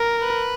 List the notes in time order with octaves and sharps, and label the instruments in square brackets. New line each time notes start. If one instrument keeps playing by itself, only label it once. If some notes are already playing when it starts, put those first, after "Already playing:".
Already playing: [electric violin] A#4
[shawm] B4